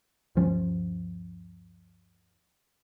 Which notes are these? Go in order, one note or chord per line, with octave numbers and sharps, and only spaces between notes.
D2 G2 F3 C#4